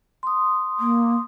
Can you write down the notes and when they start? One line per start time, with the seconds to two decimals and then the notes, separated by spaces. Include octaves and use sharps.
0.23 C6 D#6
0.79 A#3